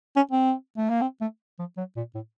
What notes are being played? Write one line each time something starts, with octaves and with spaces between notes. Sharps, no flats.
C#4
C4
A3
A#3
C4
A3
F3
F#3
A#2
A2